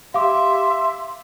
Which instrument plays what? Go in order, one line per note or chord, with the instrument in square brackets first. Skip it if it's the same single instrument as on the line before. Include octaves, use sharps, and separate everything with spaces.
[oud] G4 [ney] E5 [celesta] F5 D6 [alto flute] C6